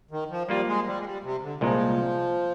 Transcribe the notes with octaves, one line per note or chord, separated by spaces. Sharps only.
D#3
F3
F3 G3 A#3 F4
G#3
G3
G#3
G3
C3
D3
C2 A#2 F3 G#3